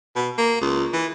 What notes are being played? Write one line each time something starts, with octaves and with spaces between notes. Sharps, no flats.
B2
A#3
C#2
E3